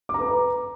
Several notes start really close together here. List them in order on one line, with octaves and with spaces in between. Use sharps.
D6 A#5 B4